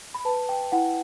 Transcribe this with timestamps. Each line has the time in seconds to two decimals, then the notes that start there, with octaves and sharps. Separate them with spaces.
0.14 B5
0.25 B4 A5
0.49 G5
0.72 E4 F#5